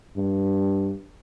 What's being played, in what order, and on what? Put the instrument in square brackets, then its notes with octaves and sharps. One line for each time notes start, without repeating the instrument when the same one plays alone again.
[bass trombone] G2